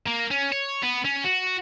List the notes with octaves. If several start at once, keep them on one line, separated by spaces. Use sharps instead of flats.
A#3
C#4
C#5
B3
C#4
F#4